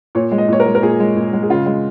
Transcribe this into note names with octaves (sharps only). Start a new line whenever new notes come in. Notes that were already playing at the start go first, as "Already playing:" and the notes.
A#2 C#5
G#3
D#5
A#2 C#5
A#4
G#3
A#4
A#2 G#4
G#3
A#2
G#3
G#4
C#3 F4
G#3